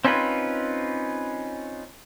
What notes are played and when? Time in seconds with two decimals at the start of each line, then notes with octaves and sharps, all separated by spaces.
0.05 C4 C#4 D#4 F4 B4